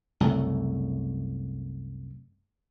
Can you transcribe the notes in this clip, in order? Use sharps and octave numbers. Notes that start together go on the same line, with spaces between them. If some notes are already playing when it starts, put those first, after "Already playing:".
C2 F#2 C#3 A3